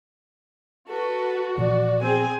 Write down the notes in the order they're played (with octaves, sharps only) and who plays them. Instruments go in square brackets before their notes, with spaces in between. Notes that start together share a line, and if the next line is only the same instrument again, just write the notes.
[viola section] F#4 [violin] A4 B4
[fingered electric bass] A#2 E3 F3 [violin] D5
[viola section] C4 G#4 [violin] G#5